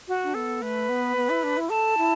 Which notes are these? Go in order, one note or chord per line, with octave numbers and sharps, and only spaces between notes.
F#4
D4
B3 A4
A3 B4
B3
B3
E4
D4
E4
A4 A5
E4